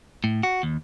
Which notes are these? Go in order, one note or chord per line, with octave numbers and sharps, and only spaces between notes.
A2
F#4
D#2